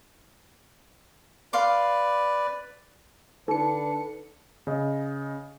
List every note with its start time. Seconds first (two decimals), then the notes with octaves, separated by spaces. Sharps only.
1.53 B4 D5 F5 C6 D6
3.48 D3 D4 D#4 A4 B4 C#7
4.67 C#3 D#5